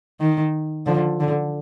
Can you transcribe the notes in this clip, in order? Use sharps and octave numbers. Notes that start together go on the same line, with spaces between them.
D#3
D3 F3
D3